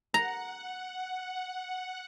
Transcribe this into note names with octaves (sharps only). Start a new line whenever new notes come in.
F#5 A#5